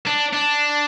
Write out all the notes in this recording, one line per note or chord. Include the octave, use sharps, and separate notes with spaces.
D4
D4